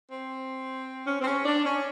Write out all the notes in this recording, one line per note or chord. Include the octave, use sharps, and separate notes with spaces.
C4
C#4
C4
C#4
D4
C#4